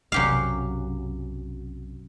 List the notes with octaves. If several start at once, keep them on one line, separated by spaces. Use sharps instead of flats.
B1 F#2 C3 G4 F5